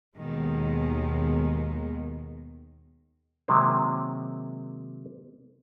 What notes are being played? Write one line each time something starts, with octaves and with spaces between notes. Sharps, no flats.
D#2 B2 D#3 G#3
C3 D#3 F#3 G#3 A#3 C4